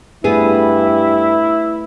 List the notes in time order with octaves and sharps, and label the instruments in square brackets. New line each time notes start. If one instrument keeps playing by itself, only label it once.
[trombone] G2 [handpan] A3 B4 [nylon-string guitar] B3 G#4 [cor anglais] E4